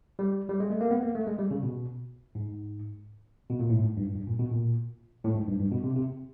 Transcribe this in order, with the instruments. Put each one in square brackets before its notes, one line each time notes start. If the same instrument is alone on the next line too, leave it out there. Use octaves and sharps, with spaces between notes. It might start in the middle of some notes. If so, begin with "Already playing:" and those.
[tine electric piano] G3
G3
G#3
A3
A#3
B3
A#3
A3
G#3
G3
C#3
B2
G#2
B2
A#2
A2
G#2
G2
G2
A#2
B2
A#2
A2
G#2
G2
G2
B2
C3
C3